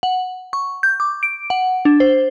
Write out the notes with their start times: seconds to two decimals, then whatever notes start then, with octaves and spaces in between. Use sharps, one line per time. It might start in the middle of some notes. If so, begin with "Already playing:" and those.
0.03 F#5
0.53 C#6
0.83 G6
1.00 D6
1.23 D7
1.50 F#5
1.85 D4
2.00 C5